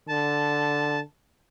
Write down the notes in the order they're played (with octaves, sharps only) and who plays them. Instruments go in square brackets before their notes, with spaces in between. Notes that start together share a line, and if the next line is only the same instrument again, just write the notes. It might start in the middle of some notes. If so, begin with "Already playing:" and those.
[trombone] D3 [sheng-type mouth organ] A5